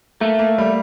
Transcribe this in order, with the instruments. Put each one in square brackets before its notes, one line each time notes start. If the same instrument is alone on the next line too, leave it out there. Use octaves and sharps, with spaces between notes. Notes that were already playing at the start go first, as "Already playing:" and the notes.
[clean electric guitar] A3 [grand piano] A#3
[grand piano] A#3
G3